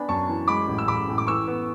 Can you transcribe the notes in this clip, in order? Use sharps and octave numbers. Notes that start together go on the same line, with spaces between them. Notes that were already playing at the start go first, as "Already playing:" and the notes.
Already playing: B3 D4 G#5 B5
F#2 A5 C#6
E3
G#3 B5 D6
A1
E6
A1 B5 D6
A2
D6
E3 C#6 E6
B3